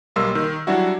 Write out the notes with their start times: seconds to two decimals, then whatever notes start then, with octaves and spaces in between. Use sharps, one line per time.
0.16 B1 G3 A#3 C6 E6
0.35 D#3
0.67 F#3 G3 D4 E4 F#4